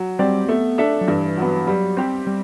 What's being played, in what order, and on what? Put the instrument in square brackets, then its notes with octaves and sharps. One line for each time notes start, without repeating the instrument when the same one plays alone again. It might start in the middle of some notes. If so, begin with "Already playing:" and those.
Already playing: [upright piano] F#3
[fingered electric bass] G3 [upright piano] C4 G4 D5
[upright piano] A3 [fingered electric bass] B3
[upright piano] D4 A4 E5
[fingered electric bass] F#3
[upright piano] G2 [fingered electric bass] E3
[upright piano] F#3 B3
[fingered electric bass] F#3 [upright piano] G3
[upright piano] C4 G4
[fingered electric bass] G3